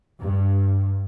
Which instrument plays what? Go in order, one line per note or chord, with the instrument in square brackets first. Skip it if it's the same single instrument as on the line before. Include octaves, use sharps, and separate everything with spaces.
[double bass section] G2